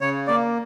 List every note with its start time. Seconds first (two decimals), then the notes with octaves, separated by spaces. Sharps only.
0.01 C#3 C#5
0.27 A#3 D5